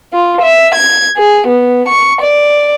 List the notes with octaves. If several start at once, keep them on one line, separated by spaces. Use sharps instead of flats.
F4
E5
G#6
G#4
B3
C#6
D5